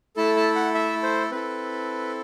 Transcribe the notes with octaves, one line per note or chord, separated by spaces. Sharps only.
A3 E4 A4 A5
A5
F#5
E5
C5
C4 E4 A4 B4